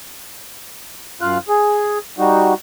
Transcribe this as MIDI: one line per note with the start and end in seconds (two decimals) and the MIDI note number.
1.21 1.38 42
1.21 1.38 65
1.21 1.38 77
1.21 1.38 90
1.48 1.98 68
2.18 2.54 55
2.18 2.54 63
2.18 2.54 66